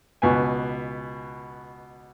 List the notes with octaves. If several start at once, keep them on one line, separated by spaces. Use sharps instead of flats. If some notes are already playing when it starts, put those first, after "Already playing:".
C#2 B2 B4 G#5